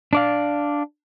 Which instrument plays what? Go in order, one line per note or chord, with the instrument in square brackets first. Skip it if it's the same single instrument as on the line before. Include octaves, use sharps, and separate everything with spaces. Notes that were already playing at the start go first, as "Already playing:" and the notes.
[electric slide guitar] D4 D5 F5